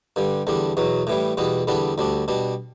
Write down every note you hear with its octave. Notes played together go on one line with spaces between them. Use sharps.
G2 D3 G3
E2 D3 G3 D4
E2 B2 F#3
A2 E3 G3
E2 B2 G3 B3
E2 D3 G3 B3 D4
D2 D3 G3 D4
B2 G3 D4